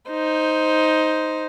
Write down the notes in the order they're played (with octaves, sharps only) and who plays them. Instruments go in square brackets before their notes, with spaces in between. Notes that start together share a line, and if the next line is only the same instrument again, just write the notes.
[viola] D#4 C5